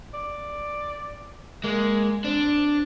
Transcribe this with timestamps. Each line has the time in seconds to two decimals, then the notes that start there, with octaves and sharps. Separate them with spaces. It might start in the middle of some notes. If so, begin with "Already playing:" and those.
0.14 D5
1.64 G#3 A#3
2.24 C4 D4